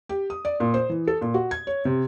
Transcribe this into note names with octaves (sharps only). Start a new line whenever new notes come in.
G4
D#6
D5
A#2
C5
E3
A4
A#2
F#4
G#6
C#5
C3